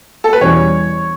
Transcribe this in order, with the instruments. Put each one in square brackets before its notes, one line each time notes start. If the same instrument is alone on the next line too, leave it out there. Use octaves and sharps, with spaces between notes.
[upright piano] A4
B4
[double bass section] E2 B2 G3 C#4 [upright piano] C#5